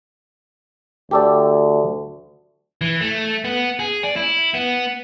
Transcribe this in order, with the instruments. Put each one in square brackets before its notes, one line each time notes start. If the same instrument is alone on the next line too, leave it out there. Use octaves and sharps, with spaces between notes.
[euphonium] D2 [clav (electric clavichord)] G4 A4 D5
[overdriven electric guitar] E3
A3
B3
G#4
D5
E4
B3